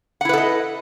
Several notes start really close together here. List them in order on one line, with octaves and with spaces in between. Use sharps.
F#5 E4 B4 A4 D#5